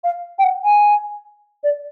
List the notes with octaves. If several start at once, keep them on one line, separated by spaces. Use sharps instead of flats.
F5
G5
F#5
G#5
D5